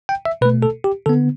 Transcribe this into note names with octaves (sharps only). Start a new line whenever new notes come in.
G5
E5
B2 A3 B4
A4
G4
D3 B3 A4